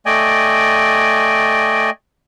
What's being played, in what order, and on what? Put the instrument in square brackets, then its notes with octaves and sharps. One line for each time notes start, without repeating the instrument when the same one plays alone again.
[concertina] A3 D5 D#5 G5 G#5